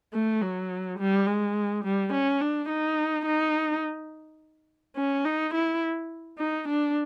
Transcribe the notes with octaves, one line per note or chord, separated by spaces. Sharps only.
A3
F#3
G3
G#3
G3
C#4
D4
D#4
D#4
C#4
D#4
E4
D#4
D4